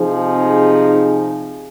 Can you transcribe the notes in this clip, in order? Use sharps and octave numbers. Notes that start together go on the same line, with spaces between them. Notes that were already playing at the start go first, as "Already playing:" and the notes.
Already playing: C3 F3 C4 D#4 G#4